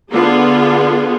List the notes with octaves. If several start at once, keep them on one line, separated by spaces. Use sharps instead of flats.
D3 B3 F4 G#4